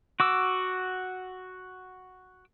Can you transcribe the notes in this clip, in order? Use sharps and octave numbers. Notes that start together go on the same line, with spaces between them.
F#4 D6 E6